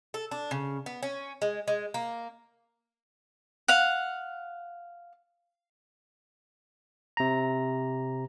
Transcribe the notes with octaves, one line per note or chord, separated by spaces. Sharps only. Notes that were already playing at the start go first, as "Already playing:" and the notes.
A4
D4
C#3
B3
C#4
G#3
G#3
A#3
F5 F#5
C3 A#5